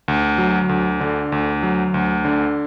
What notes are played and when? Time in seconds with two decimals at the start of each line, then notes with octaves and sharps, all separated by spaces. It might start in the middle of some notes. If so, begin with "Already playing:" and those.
0.08 D2
0.38 F#3
0.69 D2
1.00 D3
1.32 D2
1.63 F#3
1.94 D2
2.25 D3